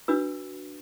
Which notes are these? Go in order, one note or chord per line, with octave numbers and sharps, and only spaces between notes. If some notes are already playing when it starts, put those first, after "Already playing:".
D4 F#4 B4 E6